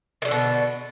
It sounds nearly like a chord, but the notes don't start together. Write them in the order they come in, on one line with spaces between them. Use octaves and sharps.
D#3 G3 D3 B2